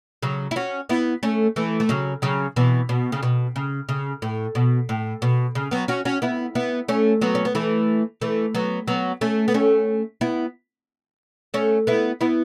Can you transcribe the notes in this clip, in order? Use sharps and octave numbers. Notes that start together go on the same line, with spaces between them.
C#3 F#3
E4
C#4 F#4
B3 E4
A3 C#4
E3 A3
A3
C#3 F#3
C#3 F#3
B2 E3
B2
C#3
B2
C#3
C#3
A2
B2
A2
B2
C#3
F#3 B3
C#4 F#4
C#4 F#4
B3 E4
B3 E4
A3 C#4
F#3 B3
C#4
B3
E3 A3
E3 A3
F#3 B3
F#3 B3
A3 C#4
B3
A3 C#4
B3 E4
A3 C#4
B3 E4
B3 E4